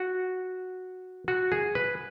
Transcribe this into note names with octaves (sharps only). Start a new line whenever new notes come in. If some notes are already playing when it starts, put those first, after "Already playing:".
Already playing: F#4
F#4
G#4
B4